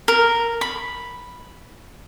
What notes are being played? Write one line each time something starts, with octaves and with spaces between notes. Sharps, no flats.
A#4
B5